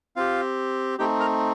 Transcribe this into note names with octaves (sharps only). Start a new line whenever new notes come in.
C4 F4 G4 F5
A3 C4 D#4 G4 G5
A#4 A#5